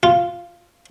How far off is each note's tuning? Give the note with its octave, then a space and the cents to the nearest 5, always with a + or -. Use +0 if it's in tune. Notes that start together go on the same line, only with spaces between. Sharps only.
F4 -10